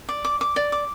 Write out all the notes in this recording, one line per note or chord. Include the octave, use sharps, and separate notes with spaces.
D5
D6
D6
D5
D6